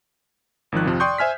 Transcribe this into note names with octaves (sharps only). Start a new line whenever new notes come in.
G#1 D#3 F3 F#6
F2 C3 F3
D5 G5 C6 C#6 D#6 G6
C5 E5 G#5 F6 B6